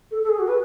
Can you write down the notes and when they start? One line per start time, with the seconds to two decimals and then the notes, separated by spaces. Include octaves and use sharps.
0.11 A4
0.23 A4
0.29 G#4
0.39 F#4
0.48 B4